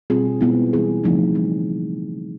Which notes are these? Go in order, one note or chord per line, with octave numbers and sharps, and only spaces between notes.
B2 G3 C4 F4 G#4
B2 G#3 B3 E4
E3 G3 B3 E4 G#4
C#3 F3 A3 C4 D#4
E3 G3